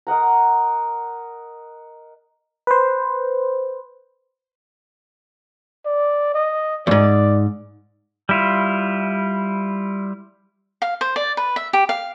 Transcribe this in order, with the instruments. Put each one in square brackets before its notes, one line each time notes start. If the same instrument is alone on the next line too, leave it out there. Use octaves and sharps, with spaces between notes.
[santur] A#4 D#5 F#5 A#5
[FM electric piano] B4 C5
[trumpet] D5
D#5
[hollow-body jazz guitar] E2 G#2 [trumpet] D5
[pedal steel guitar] G3 E4 F4
[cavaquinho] F5
C5
D5
B4
E5
G4
F5